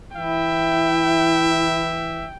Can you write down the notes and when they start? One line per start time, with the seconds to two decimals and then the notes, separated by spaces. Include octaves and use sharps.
0.16 E3 E4 E5 G5